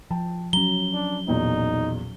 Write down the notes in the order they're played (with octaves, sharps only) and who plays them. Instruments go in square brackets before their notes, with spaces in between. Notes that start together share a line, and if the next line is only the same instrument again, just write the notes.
[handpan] F3 [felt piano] G5 A5
[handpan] F#3 C#4 [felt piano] A#5 [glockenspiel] G7
[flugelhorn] D4
[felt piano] B1 E2 A#2 [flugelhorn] D#4